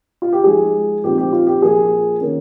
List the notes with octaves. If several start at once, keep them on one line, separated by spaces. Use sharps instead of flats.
F4
G4
F3 G#3 D#4 G#4
A#2 F3 C4 D#4 G4
G4
F4
G4
A#2 F3 A#3 G#4
D#3 A#3 C#4